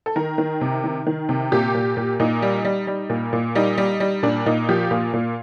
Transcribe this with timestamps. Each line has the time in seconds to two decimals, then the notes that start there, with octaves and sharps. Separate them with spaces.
0.06 A4
0.16 D#3 A#4
0.38 D#3
0.61 C3
0.84 D#3
1.07 D#3
1.29 C3
1.52 A#2 G4
1.75 A#2
1.97 A#2
2.20 A#2 D#4
2.42 G3
2.65 G3
2.87 G3
3.10 A#2
3.33 A#2
3.55 G3 D#4
3.78 G3
4.00 G3
4.23 A#2 D4
4.46 A#2 D#4
4.69 F3 G4
4.91 A#2 F4
5.13 A#2